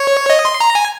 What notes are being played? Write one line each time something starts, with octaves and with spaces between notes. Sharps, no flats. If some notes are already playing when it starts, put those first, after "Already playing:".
Already playing: C#5
D#5
C6
A#5
G#5